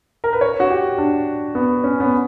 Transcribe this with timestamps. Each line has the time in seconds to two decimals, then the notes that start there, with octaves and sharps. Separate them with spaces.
0.24 A#4
0.33 B4
0.41 C#5
0.60 F#4
0.70 G4
0.98 D4
1.55 B3
1.84 C#4
2.00 B3